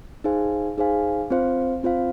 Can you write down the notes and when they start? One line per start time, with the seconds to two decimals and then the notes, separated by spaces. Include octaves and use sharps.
0.24 D#4 G#4 C5 F5 G#5
0.78 D#4 G#4 C5 F5 G#5
1.30 C4 F4 C5 F5
1.83 C4 F4 C5 F5